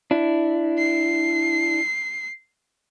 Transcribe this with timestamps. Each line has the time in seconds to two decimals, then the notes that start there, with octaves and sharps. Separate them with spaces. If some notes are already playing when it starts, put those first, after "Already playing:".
0.11 D4 E4
0.79 C7